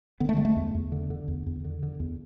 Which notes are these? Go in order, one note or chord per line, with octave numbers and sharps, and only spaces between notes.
D3 B3
A3
D3 G#3
A3
E2
E2
D3
D3
E2
E2
D3
D3
E2